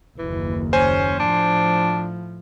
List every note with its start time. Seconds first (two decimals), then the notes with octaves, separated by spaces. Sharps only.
0.19 F#1 D#2 E3
0.73 C#4 C5 G#5
1.19 A2 F3 D4